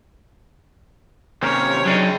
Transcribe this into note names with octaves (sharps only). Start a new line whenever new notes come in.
D#2 C3 C4 C#4 A#4 C#5
C#3 F#3 D4 D#4 G5